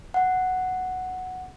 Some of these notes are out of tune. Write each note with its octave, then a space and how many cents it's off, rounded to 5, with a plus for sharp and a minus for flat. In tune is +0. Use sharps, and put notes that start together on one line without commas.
F#5 +0